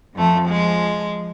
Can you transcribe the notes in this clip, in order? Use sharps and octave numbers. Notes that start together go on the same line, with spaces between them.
F2 F3 A3
G#3